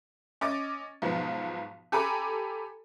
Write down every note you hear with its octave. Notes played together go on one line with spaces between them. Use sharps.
C#4 D#5 D6 A6
B1 G#2 B2 F3 B3
G4 A4 G#5 A#5 B5 D6